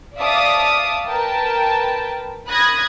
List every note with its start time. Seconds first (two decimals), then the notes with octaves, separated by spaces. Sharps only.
0.18 D5 E5 F5 A5 D6 D#6
1.07 A#4 B4 G5 A5
2.49 B5 D#6 F#6 G#6 A#6